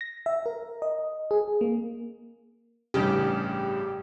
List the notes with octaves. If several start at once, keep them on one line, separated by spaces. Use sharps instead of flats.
A#6
E5
A#4
D#5
G#4
A#3
A1 G2 C#3 G4